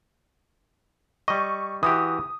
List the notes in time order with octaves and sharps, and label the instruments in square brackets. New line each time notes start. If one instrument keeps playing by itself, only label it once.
[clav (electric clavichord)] G3 D#5 [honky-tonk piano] C#6
[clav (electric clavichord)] E3 F#4 G4 [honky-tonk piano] D#6